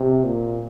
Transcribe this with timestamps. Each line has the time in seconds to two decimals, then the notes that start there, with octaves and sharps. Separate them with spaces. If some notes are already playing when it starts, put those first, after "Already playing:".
Already playing: C3
0.24 A#2